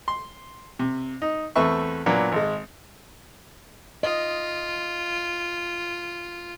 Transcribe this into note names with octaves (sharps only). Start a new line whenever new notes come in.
C6
C3
D#4
E2 A3 C4 B4 E5 C#6
A#2 F#3 A#3 B3 D4
G#1 G#3
F4 D#5